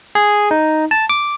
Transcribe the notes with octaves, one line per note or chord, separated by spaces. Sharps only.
G#4
D#4
A5
D6